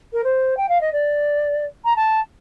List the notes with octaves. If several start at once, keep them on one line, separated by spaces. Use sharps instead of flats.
A#4
C5
G5
F5
D#5
D5
A#5
A5